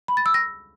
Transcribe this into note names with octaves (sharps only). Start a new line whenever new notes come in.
B5
A6
E6
A#6